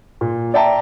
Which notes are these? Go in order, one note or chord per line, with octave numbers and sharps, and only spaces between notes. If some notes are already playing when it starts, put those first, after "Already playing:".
A#2
D5 E5 G5 A5 A#5